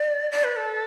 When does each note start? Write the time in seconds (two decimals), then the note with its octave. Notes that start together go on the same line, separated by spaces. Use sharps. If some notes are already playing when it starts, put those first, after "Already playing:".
Already playing: D5
0.32 D5
0.44 B4
0.56 A4